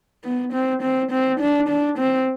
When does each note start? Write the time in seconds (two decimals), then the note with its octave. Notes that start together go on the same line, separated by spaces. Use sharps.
0.24 B3
0.53 C4
0.83 C4
1.12 C4
1.40 D4
1.69 D4
1.98 C4